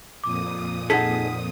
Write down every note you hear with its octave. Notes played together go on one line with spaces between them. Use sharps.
F2 A#2 D6 D#6
D#4 G#4 A4 F#5 B6